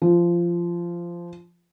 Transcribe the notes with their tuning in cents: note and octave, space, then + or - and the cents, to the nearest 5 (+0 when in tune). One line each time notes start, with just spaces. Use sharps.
F3 -15